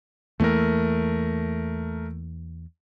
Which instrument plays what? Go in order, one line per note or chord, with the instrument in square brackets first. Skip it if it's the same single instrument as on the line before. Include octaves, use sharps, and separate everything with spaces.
[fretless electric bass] E2 E3 A#3 [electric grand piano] A3 A#4